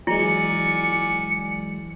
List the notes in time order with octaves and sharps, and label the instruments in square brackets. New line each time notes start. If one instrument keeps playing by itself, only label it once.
[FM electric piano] E3 F#3 G#3 [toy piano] E4 [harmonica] D5 G#5 [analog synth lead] C#7